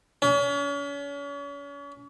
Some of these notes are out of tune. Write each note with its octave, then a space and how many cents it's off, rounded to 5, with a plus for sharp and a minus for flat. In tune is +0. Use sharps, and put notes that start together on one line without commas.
C#4 +40